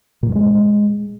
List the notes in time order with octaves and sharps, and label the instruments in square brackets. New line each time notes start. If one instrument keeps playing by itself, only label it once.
[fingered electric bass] A#2
G2
G#3